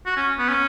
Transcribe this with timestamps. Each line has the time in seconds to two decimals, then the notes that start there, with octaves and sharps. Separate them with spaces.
0.06 F#4
0.17 C#4
0.38 B3
0.49 C#4